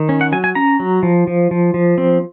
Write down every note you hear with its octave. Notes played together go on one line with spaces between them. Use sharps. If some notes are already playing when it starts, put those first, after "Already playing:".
Already playing: D#3
C#4
F#5
F#3 G#5
G#5
C#4 A#5
F#3
F3
F3
F3
F3
C4